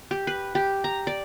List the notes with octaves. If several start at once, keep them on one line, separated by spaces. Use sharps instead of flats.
G4
B4
G4
A#5
D5